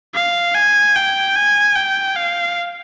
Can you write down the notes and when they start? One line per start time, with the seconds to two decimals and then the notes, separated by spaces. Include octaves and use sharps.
0.15 F5
0.55 G#5
0.96 G5
1.36 G#5
1.76 G5
2.16 F5